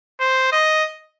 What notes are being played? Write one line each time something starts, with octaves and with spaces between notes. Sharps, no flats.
C5
D#5